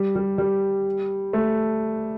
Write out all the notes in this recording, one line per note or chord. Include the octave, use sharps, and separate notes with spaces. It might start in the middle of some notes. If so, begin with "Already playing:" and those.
Already playing: G3
G3
G3
A3